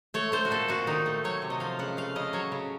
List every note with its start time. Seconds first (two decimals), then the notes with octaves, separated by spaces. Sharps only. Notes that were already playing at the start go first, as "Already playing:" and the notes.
0.14 A3 C#5
0.32 A3 C5
0.45 F#4
0.51 A#2 A4
0.68 A#2 F#4
0.87 D#3 D#4
1.06 A3
1.24 F#3 C#5
1.42 C3
1.50 D#5
1.60 F3 F5
1.79 C#3 F#5
1.97 A3 F5
2.15 C#3 D#5
2.33 F#3 C#5
2.52 C#3